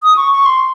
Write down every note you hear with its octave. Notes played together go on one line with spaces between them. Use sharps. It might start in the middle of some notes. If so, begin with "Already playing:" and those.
D#6
C#6
C#6
C6